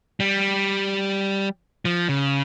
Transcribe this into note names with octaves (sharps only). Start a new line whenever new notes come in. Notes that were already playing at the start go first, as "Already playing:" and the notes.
G3
F3
C#3